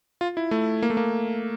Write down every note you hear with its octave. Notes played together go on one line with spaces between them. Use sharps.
F4
E4
A3
A#3
A3
A#3